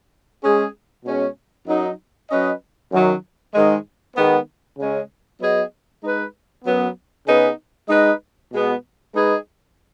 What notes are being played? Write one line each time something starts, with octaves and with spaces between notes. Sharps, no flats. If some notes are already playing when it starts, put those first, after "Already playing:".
G#3 C#4 G#4
B2 G#3 C#4
F#2 F#3 D#4
F#3 C#4 B4 D#5
F#2 D#3 F#3 C#4
G#2 D#3 G#3
D#3 G#3 B3
C#3 G#3 C#4
F#3 B3 G#4 D#5
G#3 D#4 B4
F#2 F#3 B3
C#3 B3 D#4 G#4 B4
G#3 D#4 B4 D#5
B2 G#3 B3
G#3 D#4 G#4 B4 D#5